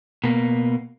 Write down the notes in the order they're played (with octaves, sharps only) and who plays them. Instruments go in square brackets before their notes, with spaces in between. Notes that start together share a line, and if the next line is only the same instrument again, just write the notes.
[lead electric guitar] B2 A#3